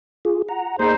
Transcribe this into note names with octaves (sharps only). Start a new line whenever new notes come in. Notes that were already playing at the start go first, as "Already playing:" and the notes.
F4 G#4
F#5 A#5
E2 A#3 D#4 G#4 C5 D#5